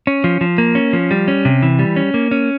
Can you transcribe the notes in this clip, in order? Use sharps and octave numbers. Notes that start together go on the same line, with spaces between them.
C#4
F3
F3
A#3
C#4
F3
G3
C#4
C3
E3
G3
C#4
A#3
C#4